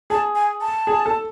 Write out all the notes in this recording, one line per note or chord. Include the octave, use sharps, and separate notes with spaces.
G#4 A5
G#5
A5
G#4
A4